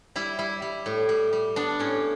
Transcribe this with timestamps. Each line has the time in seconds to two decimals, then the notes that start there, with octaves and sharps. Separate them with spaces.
0.16 G3 E4
0.39 G3 E4
0.62 G3
0.86 A2
1.09 G3
1.33 G3
1.56 B3 D4
1.79 A2 C#4